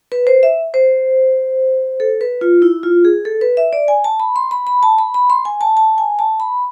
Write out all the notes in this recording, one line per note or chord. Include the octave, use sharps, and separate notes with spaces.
B4
C5
E5
C5
A4
B4
F4
E4
F4
G#4
A4
B4
E5
D5
G#5
A5
B5
C6
B5
B5
A5
B5
B5
C6
G#5
A5
A5
G#5
A5
B5